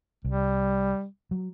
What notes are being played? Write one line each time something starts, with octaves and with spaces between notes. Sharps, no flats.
C2 G3
F#3